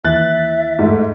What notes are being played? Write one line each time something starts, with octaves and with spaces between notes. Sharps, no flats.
D#2 E3 E5 F#6 A6
G#2 A3